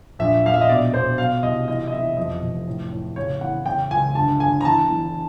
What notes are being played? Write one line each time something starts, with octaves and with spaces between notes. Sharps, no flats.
A#1 E5
A#1 F5
E5
D#5
B2 D5
B2 C5
B2 F5
C2 D#5
E3 D#5
D#5
E3 E5
F2 D#5
F1
A2
A2
C#3 C#5
E3 F#5
C#3 G5
C#2 G#5
G1 A5
G1 G#5
A#5
E3 A5
E3